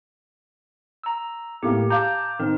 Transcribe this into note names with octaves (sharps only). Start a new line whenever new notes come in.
A#5 E6
A2 A#3 G4
F5 A5 A#5 D6 G6
D#3 C4 A#4